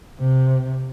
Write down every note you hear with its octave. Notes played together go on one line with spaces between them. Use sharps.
C3